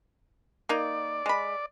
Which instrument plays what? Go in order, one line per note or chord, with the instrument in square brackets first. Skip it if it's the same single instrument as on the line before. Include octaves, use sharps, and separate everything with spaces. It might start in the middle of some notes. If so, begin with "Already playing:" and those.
[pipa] A#3 D#4 [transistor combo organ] D5
[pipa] G#3 B5